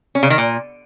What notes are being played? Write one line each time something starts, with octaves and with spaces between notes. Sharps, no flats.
C#4
C#3
D#3
A#2